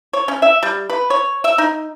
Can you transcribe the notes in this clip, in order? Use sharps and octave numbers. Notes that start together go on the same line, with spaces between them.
C#5
C#4
E5
G3
B4
C#5
E5
D#4